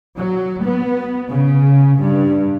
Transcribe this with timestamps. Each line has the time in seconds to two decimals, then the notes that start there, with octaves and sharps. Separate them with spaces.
0.16 F#3
0.62 B3
1.29 C#3
1.99 G2